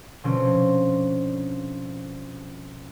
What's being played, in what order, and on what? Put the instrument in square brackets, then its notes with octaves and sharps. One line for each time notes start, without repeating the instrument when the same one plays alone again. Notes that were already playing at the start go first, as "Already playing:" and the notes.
[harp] B2 D3 F3 C4 C#4